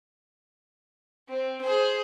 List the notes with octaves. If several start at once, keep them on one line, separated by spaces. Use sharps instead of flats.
C4
G#4 C5